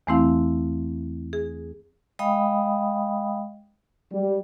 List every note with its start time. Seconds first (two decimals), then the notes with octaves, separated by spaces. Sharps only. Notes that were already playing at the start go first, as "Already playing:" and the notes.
0.07 E2 E3 A3 C4 E4 F5
1.33 G#4
2.19 G#3 D#5 F5 G5 B5 D#6
4.12 G3